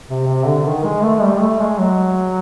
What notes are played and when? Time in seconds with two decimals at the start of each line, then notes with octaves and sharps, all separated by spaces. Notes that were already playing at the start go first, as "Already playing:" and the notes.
0.09 C3
0.27 C3
0.46 D3
0.65 D#3
0.84 G#3
1.02 A3
1.22 G3
1.40 A3
1.59 G#3
1.78 F#3